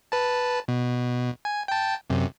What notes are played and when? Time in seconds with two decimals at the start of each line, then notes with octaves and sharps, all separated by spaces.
0.12 B4 A5
0.68 B2
1.45 G#5
1.68 G5 A5
2.10 F#2 C3